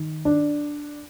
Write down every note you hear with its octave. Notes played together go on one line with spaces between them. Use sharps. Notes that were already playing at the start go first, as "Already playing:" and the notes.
Already playing: D#3
D4